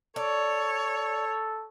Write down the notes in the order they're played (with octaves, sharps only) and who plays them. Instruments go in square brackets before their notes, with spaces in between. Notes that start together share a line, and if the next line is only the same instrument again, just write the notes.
[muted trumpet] A4 [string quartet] C#5 [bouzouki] D5